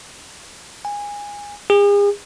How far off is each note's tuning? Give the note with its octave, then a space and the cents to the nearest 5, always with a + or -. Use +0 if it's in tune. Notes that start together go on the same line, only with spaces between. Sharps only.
G#5 -20
G#4 -40